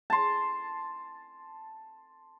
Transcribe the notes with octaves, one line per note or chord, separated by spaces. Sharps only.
A5 C6